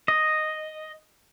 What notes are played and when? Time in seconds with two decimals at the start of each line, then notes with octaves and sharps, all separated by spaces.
0.08 D#5